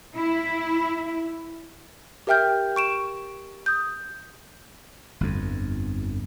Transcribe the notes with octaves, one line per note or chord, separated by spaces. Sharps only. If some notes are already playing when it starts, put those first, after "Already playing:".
E4
G4 A#4 E5 G5 F6 G6
C#6 D7 E7
D#6 G6
G1 F2